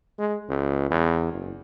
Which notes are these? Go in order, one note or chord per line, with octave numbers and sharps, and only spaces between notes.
G#3
C#2
E2
F#1